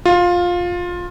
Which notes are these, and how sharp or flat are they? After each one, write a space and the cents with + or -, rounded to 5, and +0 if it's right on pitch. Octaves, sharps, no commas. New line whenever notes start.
F4 +15